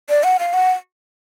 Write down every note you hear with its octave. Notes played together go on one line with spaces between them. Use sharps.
D5
F#5
F5
F#5